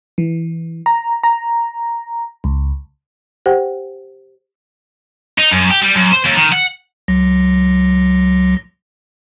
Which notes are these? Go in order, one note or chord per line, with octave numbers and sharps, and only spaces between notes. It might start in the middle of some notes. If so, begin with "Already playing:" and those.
E3
A#5
A#5
C#2
G4 C5 F#5 G5
D#4
F#2
G4
G3
F#2
C5
D#2
D#3
F#5
C#2 F#3 A#6